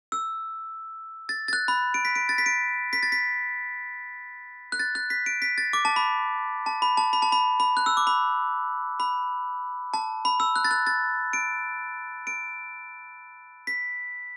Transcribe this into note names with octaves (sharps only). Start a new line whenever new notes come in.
E6
A6
A6
F#6
B5
D7
B6
D7
A6
B6
D7
B6
A6
B6
F#6
A6
F#6
B6
D7
B6
A6
D6
A5
B5
A5
B5
A5
B5
A5
B5
B5
F#6
E6
D6
B5
B5
A5
B5
E6
F#6
A6
F#6
A6
D7
D7
B6